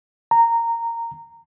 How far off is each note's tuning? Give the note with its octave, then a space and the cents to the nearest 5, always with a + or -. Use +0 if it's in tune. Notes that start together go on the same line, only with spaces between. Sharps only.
A#5 -10